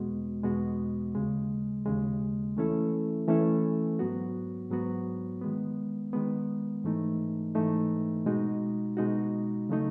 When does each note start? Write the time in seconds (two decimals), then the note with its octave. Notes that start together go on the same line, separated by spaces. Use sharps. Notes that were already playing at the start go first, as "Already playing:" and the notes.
Already playing: E2 B2 G#3 B3 F#4
0.43 E2 B2 G#3 B3 F#4
1.14 D#2 C#3 G#3
1.86 D#2 C#3 G#3
2.57 E3 A3 C#4 E4 A4
3.28 E3 A3 C#4 E4 A4
3.99 G#2 F#3 B3 F#4
4.70 G#2 F#3 B3 F#4
5.41 D#3 G#3 B3
6.13 D#3 G#3 B3
6.84 G#2 E3 A3 D#4
7.55 G#2 E3 A3 D#4
8.26 B2 G#3 D#4 F#4
8.97 B2 G#3 D#4 F#4
9.69 C#3 F#3 A3 D#4